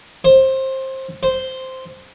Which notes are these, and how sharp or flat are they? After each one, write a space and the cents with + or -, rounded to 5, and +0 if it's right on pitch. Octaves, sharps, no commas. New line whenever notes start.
C5 +20
C5 -5